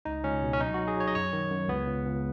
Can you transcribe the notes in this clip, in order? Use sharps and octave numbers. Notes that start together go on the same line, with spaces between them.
C#2 D#4
C#2 C#4
B2
C#4
F#3 D#4
F#3 F#4
G#4
F#3 C#5
D#5
F#2 C#5
D#3
F#2
C#2 B3
C#2
C#2